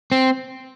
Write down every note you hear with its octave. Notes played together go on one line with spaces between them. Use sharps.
C4